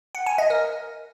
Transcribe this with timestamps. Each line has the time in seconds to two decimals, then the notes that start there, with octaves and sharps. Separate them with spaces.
0.15 F#5
0.26 G#5
0.38 D#5
0.50 A#4